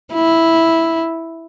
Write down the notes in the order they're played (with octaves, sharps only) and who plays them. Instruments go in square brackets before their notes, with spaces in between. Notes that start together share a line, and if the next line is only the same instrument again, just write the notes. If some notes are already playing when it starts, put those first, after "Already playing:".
[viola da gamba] E4